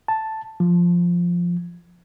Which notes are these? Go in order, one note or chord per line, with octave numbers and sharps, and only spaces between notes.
A5
F3